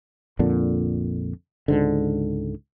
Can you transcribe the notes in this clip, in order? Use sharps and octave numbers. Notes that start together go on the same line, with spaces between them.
A#1 F2 A#2 D3
C#2 G#2 D3